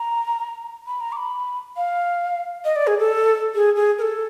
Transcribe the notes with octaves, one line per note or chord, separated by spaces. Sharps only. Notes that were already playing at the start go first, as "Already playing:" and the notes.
Already playing: A#5
B5
A#5
D6
B5
F5
D#5
D5
G#4
A4
G#4
G#4
A#4
A4